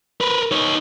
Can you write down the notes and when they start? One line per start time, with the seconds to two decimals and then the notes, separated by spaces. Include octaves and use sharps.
0.21 A#4 B4
0.52 D#4 C#5